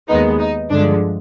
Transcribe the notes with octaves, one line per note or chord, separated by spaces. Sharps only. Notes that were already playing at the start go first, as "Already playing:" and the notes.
D#2 D#3 G#3 B3 D#4
D#4
G2 D3 F3 G#3 D4